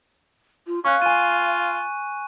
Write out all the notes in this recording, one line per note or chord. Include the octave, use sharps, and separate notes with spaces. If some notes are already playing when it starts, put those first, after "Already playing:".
F4
C#4 F5 C#6 F#6
F4 G#5 D#7